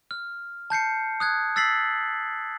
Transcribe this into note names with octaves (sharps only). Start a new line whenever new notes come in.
F6
A5 G6 C7 C#7
D#6 F#6 G#6
E6 A6 B6 C7 F#7